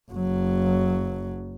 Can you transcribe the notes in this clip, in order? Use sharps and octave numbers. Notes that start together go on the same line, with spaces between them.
F#1 F#3